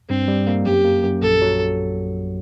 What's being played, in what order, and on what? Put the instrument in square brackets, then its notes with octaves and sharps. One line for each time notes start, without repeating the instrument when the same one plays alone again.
[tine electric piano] G2 [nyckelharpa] C4
[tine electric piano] G3
A#3
[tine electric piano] F#2 [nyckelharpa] G4
[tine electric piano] A#3
F#2
[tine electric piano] A#1 [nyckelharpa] A4
[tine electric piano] F#3